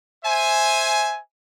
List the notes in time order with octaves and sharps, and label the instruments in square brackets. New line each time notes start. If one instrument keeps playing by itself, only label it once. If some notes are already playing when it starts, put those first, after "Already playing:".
[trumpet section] C5 E5 G#5